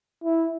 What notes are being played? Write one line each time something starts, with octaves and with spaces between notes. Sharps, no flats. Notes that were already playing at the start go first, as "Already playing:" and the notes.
E4